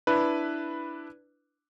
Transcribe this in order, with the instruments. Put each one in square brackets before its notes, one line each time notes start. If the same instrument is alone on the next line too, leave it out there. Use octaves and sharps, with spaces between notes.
[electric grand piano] D4 E4 B4